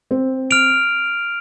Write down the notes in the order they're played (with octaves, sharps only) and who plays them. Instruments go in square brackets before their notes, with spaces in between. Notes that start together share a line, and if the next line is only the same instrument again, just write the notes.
[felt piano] C4
[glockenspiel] F6 D7 F7